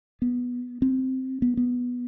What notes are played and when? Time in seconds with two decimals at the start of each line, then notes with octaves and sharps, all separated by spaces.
0.22 B3
0.82 C4
1.42 B3
1.57 B3